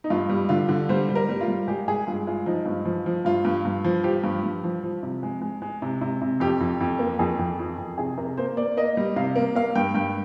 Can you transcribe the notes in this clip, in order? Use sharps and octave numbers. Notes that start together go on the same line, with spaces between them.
D#4
G2 F4
G3
D3 F4
D3
G3 C5
G3
A#4
G3
F4
G3
G#3 G4
G#3 G#4
G2 F4
G#3 F4
F3 D#4
G2
F3
F3
G2 F4
G2
G2
F3
F3 G4
G2
G2
F3
F3
C3
G#3
G#3
G#3
C3
C3
C3
F2 G4
F2
F2
A#3
F2 G#4
F2
F2
F2
C3 G#4
C3 A#4
A#3 C5
A#3 D5
A#3 D#5
G3
C3 F5
A#3
A#3 F5
G2 G5
G2 G5